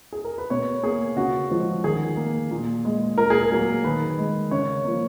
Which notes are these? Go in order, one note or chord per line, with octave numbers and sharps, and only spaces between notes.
G#4
A#4
B4
B2 C#5
A#3 G#4
C#3 F#4
F3 G#3
D#3 G#4
A#3
A#2
G#3
A#2 A#4
G#4
A#4
F#3 A#3
D#3 B4
G#3
C#3 C#5
F3 A#3